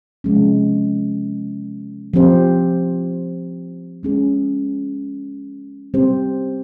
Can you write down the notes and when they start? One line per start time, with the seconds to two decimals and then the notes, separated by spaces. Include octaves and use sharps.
0.24 C3 F3 G#3 C#4
2.14 F3 C4 G4 C5
4.03 G#3 C#4 G#4
5.94 G3 C4 G4 C5